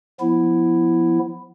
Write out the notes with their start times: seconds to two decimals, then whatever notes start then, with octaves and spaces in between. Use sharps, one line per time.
0.20 F3 B3 E4